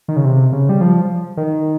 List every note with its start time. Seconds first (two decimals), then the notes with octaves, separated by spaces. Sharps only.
0.08 D#3
0.16 C#3
0.24 C3
0.53 C#3
0.69 G3
0.81 F3
1.37 D#3